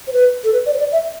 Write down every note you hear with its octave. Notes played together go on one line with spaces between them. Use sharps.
C5
B4
A4
B4
D5
C5
D5
E5